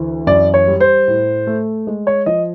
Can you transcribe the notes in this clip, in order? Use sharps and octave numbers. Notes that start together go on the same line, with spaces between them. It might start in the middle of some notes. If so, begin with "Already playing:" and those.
Already playing: D2 E3
F#2 D5
C#5
G3
C5
A2
A3
G#3
C#5
F3 D#5